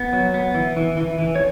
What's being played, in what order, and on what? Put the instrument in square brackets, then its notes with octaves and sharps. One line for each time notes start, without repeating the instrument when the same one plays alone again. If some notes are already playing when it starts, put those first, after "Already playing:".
Already playing: [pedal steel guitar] B3
F#3
B3
E3
E3
E3
E3
C#5